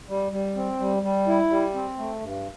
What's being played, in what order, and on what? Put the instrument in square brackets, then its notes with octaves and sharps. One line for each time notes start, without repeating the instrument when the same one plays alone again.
[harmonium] G3
G3
C4
G3
G3
E4
G3
C4
A3
G2